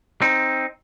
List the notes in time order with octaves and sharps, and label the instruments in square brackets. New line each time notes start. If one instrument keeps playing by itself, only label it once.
[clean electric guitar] C4 D#4